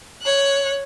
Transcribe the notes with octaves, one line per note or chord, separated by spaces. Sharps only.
C#5 F#6